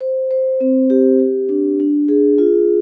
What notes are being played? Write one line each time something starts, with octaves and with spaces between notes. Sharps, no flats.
C5
C5
C4
G4
G4
D4
D4
G#4
F4